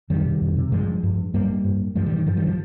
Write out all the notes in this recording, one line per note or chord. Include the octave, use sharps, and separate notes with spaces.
F2 D#3 G3
C3
F2
C3
G2 F3 G#3
G2
G2 G3 A#3
G2
G2 F3 G#3
D#3 G3
D#3
G2 F3
D#3 G3
F3